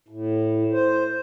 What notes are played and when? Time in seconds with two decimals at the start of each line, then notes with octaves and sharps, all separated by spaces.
0.09 A2
0.72 C5